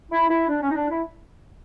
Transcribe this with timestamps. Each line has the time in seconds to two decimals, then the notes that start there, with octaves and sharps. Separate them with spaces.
0.11 E4
0.29 E4
0.48 D4
0.61 C#4
0.70 D#4
0.75 D4
0.89 E4